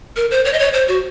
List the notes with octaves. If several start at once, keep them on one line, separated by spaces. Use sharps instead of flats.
A#4
C5
C#5
D#5
C#5
C5
F#4